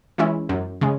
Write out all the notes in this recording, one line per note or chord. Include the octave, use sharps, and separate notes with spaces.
E3 G#3 C#4 E4
F#2
C#3 G#3